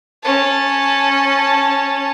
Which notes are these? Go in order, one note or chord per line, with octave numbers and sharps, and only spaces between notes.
C#4 A5